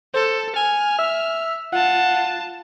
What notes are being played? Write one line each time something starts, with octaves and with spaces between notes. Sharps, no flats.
A4 C5
G#5 F6
E5
F4 F#5 A5